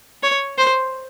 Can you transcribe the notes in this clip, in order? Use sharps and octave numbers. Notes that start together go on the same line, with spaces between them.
C#5
C5